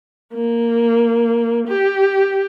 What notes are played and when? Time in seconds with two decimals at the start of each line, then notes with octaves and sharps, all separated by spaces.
0.34 A#3
1.68 G4